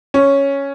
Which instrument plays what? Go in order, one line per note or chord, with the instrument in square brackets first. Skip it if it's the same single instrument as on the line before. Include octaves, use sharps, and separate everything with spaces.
[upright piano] C#4